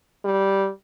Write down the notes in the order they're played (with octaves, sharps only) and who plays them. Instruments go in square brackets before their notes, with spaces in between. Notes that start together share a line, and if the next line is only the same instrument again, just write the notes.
[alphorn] G3